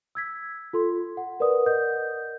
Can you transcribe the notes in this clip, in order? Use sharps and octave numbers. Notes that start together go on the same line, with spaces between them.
E6 G#6 B6
F4 A4 C6
F#5
A#4 B4 D5 F#5 D#6
A#4 D#5 F#5 G6